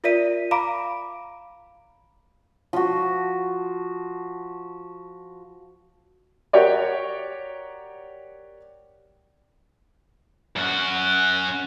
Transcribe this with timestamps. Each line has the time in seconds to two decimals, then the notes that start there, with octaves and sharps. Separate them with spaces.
0.04 F4 A#4 D5 E5 B6 D#7
0.51 F5 A#5 B5 D6 D7
2.73 F3 F#4
6.53 F#4 G4 A#4 C#5 D5
10.56 F#2 F#4